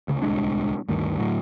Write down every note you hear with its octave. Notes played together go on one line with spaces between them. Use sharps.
D2 C#3
D1 C2 G#3 D4
D2 G2 D#3
D2 A2 F#3